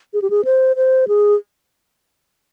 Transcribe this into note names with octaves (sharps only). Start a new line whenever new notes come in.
G#4
G4
G#4
C5
C5
G#4